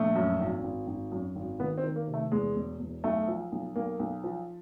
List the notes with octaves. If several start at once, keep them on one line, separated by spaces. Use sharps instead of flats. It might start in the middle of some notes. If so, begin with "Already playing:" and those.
Already playing: A#1 A3
F#2
G#1
G#1
G#1
F#2
G#1
D#3 B3
C4
D#3
A#3
C3
A3
E2 G#3
E1
E2
B1 A3
F3
B1
B1 A#3
B1
F3